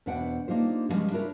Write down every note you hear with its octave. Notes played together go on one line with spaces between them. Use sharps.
E2 B2 D4 C5 F#5 G5
A#3 D4 D#4 F4 G4 C5
D3 F3 G3 G#3 C#4
D4 E4 F4 A#4 B4 C#5